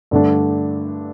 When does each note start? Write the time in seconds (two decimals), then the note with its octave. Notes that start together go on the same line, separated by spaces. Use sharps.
0.11 G2 D3 A3 D4